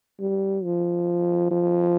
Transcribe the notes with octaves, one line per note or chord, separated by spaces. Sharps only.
G3
F3
F3